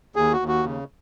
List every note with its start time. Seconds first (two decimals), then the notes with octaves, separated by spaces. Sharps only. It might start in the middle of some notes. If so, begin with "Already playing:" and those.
0.16 D#2 G#4
0.33 F#4
0.40 D#2
0.48 F#4
0.65 C#3